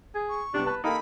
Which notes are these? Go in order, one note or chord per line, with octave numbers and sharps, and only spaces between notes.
G#4
C#6
C3 G3 B3 D4
B4 A5 F#6
A#3 D#4 G4 A4 B5